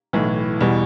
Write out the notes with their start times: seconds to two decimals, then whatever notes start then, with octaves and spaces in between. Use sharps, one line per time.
0.13 B1 A2 E3
0.61 E2 B2 G3